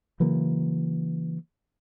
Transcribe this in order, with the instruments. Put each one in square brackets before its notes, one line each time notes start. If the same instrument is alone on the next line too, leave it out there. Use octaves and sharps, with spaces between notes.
[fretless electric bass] C#3 E3 F#3 A#3